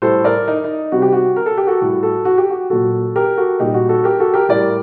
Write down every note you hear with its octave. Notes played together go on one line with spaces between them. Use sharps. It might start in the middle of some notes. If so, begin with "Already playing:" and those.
A2 G3 A4 C5
A#4 D5
D#4
D#4
C3 G3 F#4
G4
F#4
A#4
A4
G4
F#4 A4
A2 G3 F#4
F#4 A4
F#4
G4
F#4
A#2 F#3 F#4 A4
G4 A#4
F#4 A4
A#2 G3 D#4 G4
F#4
F#4 A4
G4 A#4
F#4 A4
G4 A#4
A2 G3 A#4 D5